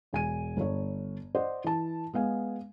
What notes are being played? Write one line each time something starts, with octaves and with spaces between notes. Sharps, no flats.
E1 G#5 D#7
G1 C#5
C5 D5 D#5 F#5
E3 A5
G#3 B3 F5 G#5